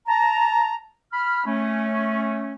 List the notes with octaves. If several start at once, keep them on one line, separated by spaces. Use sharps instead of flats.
A5 A#5
B5 F6
A3 C#4